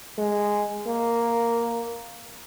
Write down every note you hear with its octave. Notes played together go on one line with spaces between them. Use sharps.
G#3
A#3